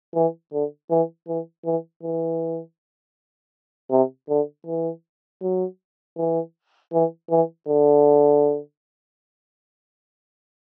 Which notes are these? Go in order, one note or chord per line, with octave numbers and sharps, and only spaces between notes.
E3
D3
E3
E3
E3
E3
C3
D3
E3
F#3
E3
E3
E3
D3